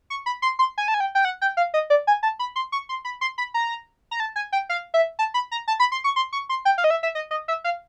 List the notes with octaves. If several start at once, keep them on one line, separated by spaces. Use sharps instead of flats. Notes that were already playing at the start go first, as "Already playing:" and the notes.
C#6
B5
C6
C6
G#5
A5
G#5
G5
G5
F#5
G5
F5
D#5
D5
G#5
A5
B5
C6
C#6
C6
B5
C6
B5
A#5
A#5
A5
G#5
G5
F5
E5
A5
B5
A#5
A5
B5
C6
C#6
C6
C#6
C6
G5
F5
D#5
E5
E5
D#5
D#5
E5
F5